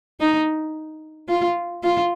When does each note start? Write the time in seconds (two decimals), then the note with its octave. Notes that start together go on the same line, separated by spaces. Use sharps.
0.20 D#4
1.28 F4
1.83 F4